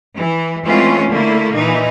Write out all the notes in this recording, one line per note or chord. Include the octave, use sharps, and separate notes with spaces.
E3
E3 G#3 A3 C4 C#4 F4
D3 A3 A#3 E4
A#2 E3 D#4